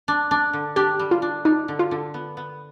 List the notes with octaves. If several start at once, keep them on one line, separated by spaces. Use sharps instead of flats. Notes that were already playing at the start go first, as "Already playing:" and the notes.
D4
D4
D3
D4 G4
G3
F4
D4
D4 D#4
D3
F4
D3
B3
B3